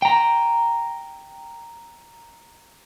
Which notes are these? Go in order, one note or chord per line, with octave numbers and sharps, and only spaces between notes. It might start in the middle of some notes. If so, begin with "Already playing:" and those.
G5 A#5